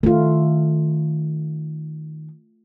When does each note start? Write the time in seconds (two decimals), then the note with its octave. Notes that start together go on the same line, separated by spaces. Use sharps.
0.03 D#3 A3 F4